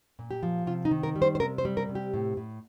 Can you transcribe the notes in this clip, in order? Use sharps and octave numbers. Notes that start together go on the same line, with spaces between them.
A#2
G4
F3
C3 F4
D#4
D#3
A#4
G3
C5
C5
C3 A#4
C5
G3
A#4
C3
G4
A2
A2